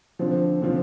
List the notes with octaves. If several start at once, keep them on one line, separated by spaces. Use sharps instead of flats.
D3 F3 C4
D3 F3 C4